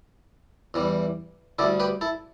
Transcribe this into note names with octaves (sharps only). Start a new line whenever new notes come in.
E2 E3 G3
D2 D3 G3 E4 A4
G4 B4
E4 A4